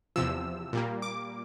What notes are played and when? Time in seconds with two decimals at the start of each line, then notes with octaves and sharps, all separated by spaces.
0.16 E2 C3 F3 E6
0.73 A#2 G3 A#3
1.02 D6